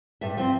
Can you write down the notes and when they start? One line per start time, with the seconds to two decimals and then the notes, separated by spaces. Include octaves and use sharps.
0.21 G2 E5
0.37 F3 C4 E5